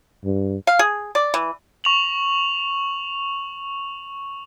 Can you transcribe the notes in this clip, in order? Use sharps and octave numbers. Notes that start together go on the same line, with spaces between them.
G2
F5
G#4
D5
E3
C#6 F7 F#7